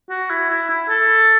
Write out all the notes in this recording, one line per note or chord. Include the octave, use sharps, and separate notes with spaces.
F#4
E4
E4
E4
A4